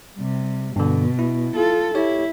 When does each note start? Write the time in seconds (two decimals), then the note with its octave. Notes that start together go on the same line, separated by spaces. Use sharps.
0.16 C3 G3
0.76 G2 B2 D3
1.19 E4
1.55 F4 A4
1.95 E4 G4 C#5